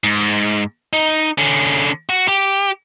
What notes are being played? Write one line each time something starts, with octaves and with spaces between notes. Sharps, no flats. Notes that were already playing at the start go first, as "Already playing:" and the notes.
G#2
D#4
D3 C#4
F#4
G4